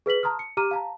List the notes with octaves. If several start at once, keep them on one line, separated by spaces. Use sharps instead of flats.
G#4 B4 B6 F#7
A5 A#5 C6 D#6 F6
C#7
G4 A#5 D6 F6 D#7
F5 A5 A#5